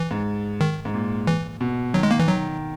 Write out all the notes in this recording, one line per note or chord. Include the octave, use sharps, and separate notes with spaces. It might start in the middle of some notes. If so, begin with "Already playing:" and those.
Already playing: E3
G#2
D#3
G#2
A#2
E3
B2
D#3 F#3
G#3
A#3
E3
D#3 F#3